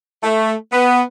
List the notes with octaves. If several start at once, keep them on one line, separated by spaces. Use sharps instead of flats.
A3
B3